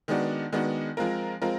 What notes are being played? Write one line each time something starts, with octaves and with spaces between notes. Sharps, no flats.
D#3 G#3 B3 D4 F#4
D#3 G#3 B3 D4 F#4
F3 G#3 C4 F4 A#4
F3 G#3 C4 F4 A#4